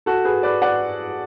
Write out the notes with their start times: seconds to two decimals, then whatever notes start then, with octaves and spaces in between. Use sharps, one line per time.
0.06 F#4 A4
0.24 G#4 B4
0.43 B4 D5
0.62 D5 F#5